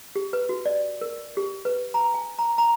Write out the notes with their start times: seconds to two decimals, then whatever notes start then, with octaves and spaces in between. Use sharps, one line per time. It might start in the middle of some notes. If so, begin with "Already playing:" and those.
0.16 G4
0.33 B4
0.49 F#4
0.66 D5
1.01 A#4
1.37 G4
1.65 B4
1.94 A#5
2.14 G#5
2.39 A#5
2.58 A#5